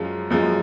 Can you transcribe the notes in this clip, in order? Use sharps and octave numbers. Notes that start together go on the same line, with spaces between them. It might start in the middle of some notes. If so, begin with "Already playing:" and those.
Already playing: F#2 F3 G#3
F#2 F3 G#3